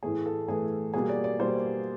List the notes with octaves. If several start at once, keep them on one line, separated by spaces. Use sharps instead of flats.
A2 E3 A3 G#4
A4
A2 E3 A3 G#4
B2 G3 A#3 G#4
D5
D5
B2 G3 A#3 C5